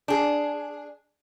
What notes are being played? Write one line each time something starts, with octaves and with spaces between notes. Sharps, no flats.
D4 G#4